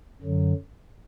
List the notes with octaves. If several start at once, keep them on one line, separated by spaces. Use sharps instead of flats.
F#2 D3 F#3